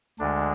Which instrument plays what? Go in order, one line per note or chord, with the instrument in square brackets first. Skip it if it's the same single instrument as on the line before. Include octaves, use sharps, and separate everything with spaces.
[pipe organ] D2 D3 G#3 D4